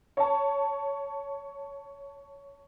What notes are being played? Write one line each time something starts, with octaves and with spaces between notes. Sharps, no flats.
C#5 A5